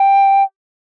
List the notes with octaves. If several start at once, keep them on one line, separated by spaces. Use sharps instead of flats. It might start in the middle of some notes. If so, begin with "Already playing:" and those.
Already playing: G5